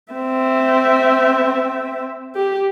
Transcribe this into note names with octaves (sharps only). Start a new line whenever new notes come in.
C4 E5
G4